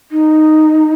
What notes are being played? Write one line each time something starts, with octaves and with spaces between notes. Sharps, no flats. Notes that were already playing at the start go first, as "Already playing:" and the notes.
D#4